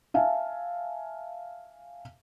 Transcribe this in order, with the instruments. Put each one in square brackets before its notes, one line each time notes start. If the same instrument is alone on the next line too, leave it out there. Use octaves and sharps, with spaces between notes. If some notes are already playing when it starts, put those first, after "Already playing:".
[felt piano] E5 F5 G#5 A5